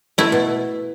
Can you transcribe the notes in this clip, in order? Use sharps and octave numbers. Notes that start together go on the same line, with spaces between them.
A3 E4
B2